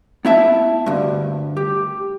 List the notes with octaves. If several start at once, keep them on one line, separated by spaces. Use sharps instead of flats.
B3 E4 E5 A5
D2 G2
G4